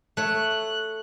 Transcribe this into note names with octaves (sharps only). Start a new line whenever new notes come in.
A3 C#5 F#6